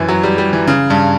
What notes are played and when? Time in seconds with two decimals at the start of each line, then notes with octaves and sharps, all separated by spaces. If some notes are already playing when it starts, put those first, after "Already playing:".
Already playing: F#2 E3
0.08 F#3
0.23 G3
0.38 G3
0.53 E3
0.67 C#3
0.90 G2